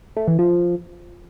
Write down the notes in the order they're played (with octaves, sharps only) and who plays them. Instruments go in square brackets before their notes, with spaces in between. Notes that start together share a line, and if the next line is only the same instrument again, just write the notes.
[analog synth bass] A3
E3
F3